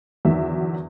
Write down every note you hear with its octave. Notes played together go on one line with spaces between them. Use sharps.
G1 E2 D#3 F#3 E5